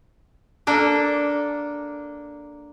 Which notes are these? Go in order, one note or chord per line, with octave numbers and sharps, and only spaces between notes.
A#3 D4 A4